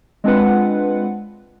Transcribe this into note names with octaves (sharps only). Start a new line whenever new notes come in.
G#3 C4 D4 F4 B4 F#5